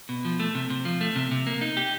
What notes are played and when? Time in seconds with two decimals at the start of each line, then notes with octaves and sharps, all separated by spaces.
0.09 B2
0.25 F3
0.40 A3
0.55 C3
0.70 C3
0.85 F3
1.01 A3
1.16 C3
1.31 C3
1.47 A#3
1.61 D#4
1.77 G4